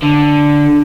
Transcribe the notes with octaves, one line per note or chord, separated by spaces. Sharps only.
D3